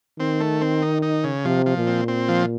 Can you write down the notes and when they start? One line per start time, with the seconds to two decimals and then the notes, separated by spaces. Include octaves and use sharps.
0.19 D#3 C4
0.40 A3
0.61 C4
0.82 D#4
1.03 D#4
1.24 C#3
1.45 C3 F3
1.66 F3
1.77 A#2
1.87 C4
2.08 C4
2.29 F3